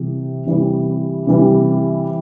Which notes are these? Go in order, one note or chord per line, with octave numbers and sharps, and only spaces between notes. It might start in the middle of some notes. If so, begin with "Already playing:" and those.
Already playing: C3 E3 G3
C3 E3 G3
C3 E3 G3